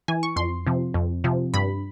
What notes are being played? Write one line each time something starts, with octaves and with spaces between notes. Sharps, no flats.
E3 G#5
C#6
F2 C6
C3 F3
F2
C3 F3
G2 B5